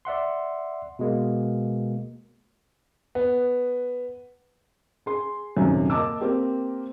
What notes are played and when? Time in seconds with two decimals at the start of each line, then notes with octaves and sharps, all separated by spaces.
0.05 D5 E5 F#5 C6
0.99 B2 G#3 A#3
3.15 B3
5.06 G#4 C6
5.56 D#1 F#2 C3 D#3 G#5
5.90 A#3 D#5 A5 D6 E6
6.20 A#3 C4 G4 A#4